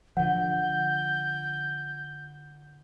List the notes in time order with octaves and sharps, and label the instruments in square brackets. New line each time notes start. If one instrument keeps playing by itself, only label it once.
[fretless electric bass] D3 F3 [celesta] F#5 [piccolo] G6